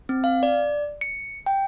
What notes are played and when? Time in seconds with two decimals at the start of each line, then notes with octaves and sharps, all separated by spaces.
0.09 C4
0.24 F5
0.43 D5
1.01 C#7
1.46 G5